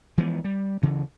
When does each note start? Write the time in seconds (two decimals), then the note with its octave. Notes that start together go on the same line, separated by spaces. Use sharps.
0.18 E3 F3 G#3 B3
0.44 G3
0.82 D2 C#3 E3